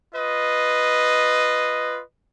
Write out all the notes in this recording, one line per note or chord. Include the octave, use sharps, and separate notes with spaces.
F4 B4 D#5